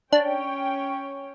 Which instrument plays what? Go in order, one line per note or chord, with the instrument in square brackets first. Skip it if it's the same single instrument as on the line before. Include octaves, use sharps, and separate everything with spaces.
[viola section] C#4 C#5 G5 [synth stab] D4